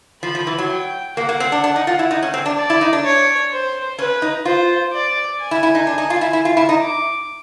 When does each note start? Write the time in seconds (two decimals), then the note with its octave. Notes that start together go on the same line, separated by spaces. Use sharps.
0.22 F3 B5
0.35 F3
0.47 E3
0.58 F#3
0.70 G5
1.17 A#3 F#5
1.29 A#3
1.40 C4
1.52 D4
1.64 D4
1.76 D#4
1.87 F4
1.99 E4
2.11 D#4
2.23 C#4
2.34 C4
2.46 D4
2.57 D5
2.70 E4
2.81 D#4
2.93 D4
3.05 C#5
3.52 C5
3.99 C#4 B4
4.22 D#4
4.45 F4 C5
4.93 D5
5.40 G#5
5.51 E4
5.63 E4
5.75 D#4
5.87 D4
5.98 D#4
6.10 F4
6.21 E4
6.33 E4
6.45 F4
6.57 E4
6.69 D#4
6.81 D6